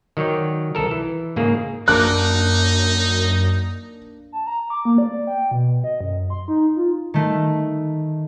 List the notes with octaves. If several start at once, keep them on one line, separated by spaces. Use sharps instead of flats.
D#3 F#3 C#5 D5 G5
C2 A4 A#4
E3
G#2 C#3 A#3 G#4
F#2 A#3 D4 D#4 A#4 F#6
A5
A#5
D6
A#3
D5
G5
B2
D#5
F#2
C6
D#4
F4
D#3 A3